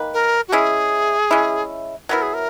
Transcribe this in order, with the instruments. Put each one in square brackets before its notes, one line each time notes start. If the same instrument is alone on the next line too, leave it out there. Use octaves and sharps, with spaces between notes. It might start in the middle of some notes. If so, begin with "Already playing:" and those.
Already playing: [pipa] D#3 A#3 B4
[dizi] A#4
F#4
[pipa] G#3 C#4 E4 [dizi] G#4
[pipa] G#3 C#4 E4
[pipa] F#3 B3 E4 [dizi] A#4
[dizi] G#4
A#4